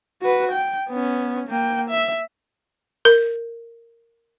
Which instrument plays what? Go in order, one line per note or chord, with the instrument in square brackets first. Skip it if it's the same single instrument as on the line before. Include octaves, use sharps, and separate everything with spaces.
[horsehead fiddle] F#4 B4
G5
B3 C#4
A#3 G5
E5
[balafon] A#4